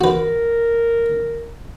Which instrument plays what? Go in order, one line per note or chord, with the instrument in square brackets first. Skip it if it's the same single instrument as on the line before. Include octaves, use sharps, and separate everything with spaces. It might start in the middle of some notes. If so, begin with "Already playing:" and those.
[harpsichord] F#4 B4 [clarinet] A#4